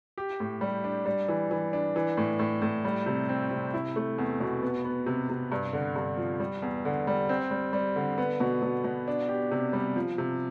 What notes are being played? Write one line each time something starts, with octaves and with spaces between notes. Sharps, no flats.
G4
A2
G3
D4
G3
E3
E3
D4
E3
A2
A2
A2
G3
C3
C4
C3
E4
A3
E2
B2
B3
B3
C3
C3
G2
D3
G2
F3
G3
E2
D3
G3
C4
G3
G3
D3
B3
B2
B2
B2
D4
G4
C3
G3
F3
C3